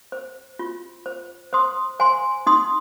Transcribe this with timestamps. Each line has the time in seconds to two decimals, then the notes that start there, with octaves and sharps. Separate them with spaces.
0.12 C5
0.59 F4
1.06 C5
1.53 C5 C6 D#6
2.00 C5 G#5 C6
2.47 D#4 C6 D#6